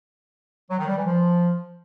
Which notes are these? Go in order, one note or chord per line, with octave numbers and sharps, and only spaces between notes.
F#3
D#3
G3
E3
F3